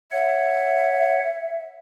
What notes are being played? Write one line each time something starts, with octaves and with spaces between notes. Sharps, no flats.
C#5 E5 F#5